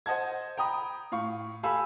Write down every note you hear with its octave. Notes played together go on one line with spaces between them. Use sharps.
C5 D#5 F#5 A5 G#6
G5 A#5 B5 D#6
A2 F5 C#6
G4 A4 F5 G#5 B5 E6